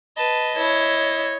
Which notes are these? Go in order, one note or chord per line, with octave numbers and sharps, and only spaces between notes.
B4 D#5 A5
E4 C#5